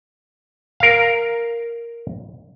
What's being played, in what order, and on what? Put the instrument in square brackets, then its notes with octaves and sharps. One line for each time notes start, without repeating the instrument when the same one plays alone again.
[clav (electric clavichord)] A#4 F5